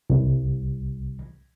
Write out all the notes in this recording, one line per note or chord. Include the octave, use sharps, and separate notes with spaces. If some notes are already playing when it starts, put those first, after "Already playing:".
C2